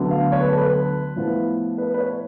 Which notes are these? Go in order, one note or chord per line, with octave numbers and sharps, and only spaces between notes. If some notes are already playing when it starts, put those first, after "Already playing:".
Already playing: D2 D3 F#3 B3
F5
C#5
B4
A4
B4
A2 F3 B3 F4
B4
B4
C#5